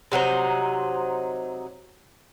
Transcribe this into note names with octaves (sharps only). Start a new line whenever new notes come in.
C3 F#3 D#4 C5